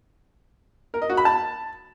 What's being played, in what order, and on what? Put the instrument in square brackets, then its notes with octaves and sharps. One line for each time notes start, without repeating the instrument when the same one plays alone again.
[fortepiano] A#4
D#5
F#4
B5
A5